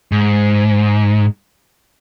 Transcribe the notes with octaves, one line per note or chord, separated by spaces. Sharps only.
G#2